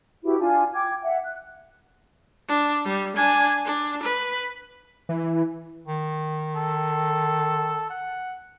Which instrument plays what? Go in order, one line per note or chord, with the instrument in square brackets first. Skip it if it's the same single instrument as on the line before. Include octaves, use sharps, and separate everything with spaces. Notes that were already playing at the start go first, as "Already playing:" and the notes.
[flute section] E4 F#4 G4 B4
D4 F4 G#5
G5 D6 G#6
E5 F#5
F#6
[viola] D4
G3
D4 G#5
D4
B4
[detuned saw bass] E3
[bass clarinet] D#3
[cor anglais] A4
F#5